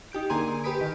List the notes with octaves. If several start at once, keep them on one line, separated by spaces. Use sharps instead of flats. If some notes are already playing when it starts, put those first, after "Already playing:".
D#4 G4 G6 D7
D3 A#3 G#4 G#5 C6 D#7
G4 B4 B5 D#6 B6 D7
D#3